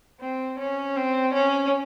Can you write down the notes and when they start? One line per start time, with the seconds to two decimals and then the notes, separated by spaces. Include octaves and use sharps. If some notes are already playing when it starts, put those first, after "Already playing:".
0.20 C4
0.59 C#4
0.96 C4
1.34 C#4